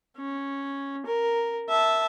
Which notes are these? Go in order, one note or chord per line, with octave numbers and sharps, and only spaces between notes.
C#4
A#4
E5 A5